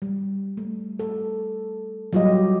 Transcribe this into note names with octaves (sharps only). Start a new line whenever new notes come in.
G3
A3
A4
F#3 G3 F4 G4 D#5